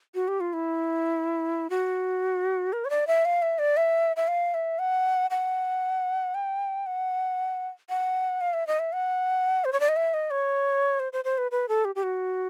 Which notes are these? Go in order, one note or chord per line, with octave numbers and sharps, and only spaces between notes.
F#4
G4
F4
E4
F#4
A#4
C#5
D5
E5
F5
E5
D5
E5
E5
F5
E5
F#5
F#5
G5
F#5
F#5
F5
E5
D#5
E5
F#5
C5
C#5
D5
D#5
E5
D#5
C#5
C5
C5
C5
B4
B4
A4
G4
G4
F#4